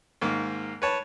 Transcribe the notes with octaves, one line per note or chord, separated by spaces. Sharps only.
G#2 D#3 A#3
B4 C#5 A5